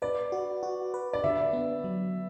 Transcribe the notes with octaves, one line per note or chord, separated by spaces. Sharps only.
B4 D5
F#4
F#4
B4
D5
D3 E5
B3
F#3